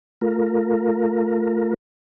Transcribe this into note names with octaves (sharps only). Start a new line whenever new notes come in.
A3 F4 A#4